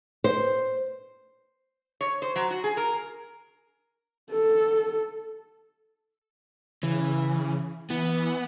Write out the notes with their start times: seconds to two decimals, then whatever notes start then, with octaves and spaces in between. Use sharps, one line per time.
0.24 C5
2.01 C#5
2.22 C5
2.36 F#3
2.51 F#4
2.64 G#4
2.77 A#4
4.31 A4
6.83 C#3 E3
7.90 E3 B3